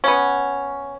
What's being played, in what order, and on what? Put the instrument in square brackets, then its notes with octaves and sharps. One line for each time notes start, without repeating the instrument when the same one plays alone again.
[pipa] B3 C#4